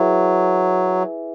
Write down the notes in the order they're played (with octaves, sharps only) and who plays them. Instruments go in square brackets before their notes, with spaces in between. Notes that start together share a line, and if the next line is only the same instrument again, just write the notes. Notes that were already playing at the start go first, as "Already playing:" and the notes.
Already playing: [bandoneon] F#3 [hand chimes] E4 G#4 B4 E5 G#5